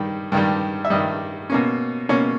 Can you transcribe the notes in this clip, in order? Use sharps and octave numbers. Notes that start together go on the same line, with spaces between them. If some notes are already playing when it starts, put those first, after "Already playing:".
Already playing: G2 D#3 G3
G2 D#3 G3
E5
G2 D#3 G3 D#5
B2 A#3 C#4
B2 A#3 C#4 C#5